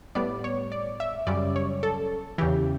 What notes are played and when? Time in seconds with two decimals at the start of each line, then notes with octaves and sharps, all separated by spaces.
0.15 A2 G3 B3 D5
0.44 C#5
0.72 D5
1.00 E5
1.27 F#2 C#3 G3 C#4 D5
1.56 C#5
1.83 A4
2.38 E2 C#3 E3 G4